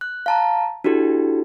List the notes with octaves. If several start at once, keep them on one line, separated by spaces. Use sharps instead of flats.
F#6
F5 A5 A#5
D4 E4 F#4 G4 A4